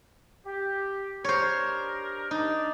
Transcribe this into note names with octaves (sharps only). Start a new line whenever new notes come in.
G4
D4 G4 A#4 C5 C#5
D4 D#4